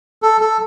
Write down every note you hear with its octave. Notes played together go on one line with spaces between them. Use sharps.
A4
A4